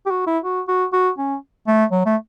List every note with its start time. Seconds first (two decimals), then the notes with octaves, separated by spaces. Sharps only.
0.06 G4
0.11 F#4
0.27 E4
0.44 F#4
0.68 F#4
0.93 F#4
1.18 C#4
1.67 A3
1.92 F#3
2.06 A3